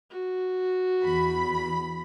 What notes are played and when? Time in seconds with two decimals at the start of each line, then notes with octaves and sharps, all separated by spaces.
0.10 F#4
1.04 E2 B5